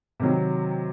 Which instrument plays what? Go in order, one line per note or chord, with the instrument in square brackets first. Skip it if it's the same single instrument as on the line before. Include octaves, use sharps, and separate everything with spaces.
[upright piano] C3 D#3 F#3